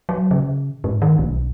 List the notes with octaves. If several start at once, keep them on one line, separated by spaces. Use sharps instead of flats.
F#3
C#3
G#2
D#3
B1